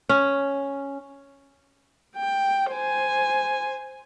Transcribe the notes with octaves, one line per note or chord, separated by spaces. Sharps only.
C#4
G5
C5 G#5